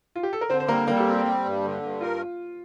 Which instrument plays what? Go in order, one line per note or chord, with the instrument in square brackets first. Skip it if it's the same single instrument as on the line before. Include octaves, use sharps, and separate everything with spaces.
[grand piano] F4
G4
A4
A#4
[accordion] D3 [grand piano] C4 C5
[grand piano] C5
[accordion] G3 [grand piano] A#3 A#4
[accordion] G3 [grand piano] A#3 A#4
[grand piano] A4
G4
[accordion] C4
[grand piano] G4
[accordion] G3
G2
D3
G2
[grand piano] F4 [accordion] A#4